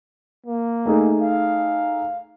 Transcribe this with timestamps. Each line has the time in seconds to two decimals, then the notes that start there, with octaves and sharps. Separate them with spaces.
0.46 A#3
0.86 A3 D#4 G#4
1.22 F5